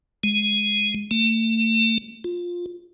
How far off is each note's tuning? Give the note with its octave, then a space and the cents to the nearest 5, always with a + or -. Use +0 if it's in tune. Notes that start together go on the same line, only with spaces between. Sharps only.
G#3 +0
A3 +35
F4 +10